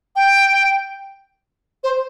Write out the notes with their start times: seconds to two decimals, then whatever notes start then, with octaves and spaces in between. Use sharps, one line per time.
0.16 G5
1.84 C5